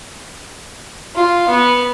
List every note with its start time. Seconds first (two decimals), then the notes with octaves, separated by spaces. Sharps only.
1.15 F4
1.48 B3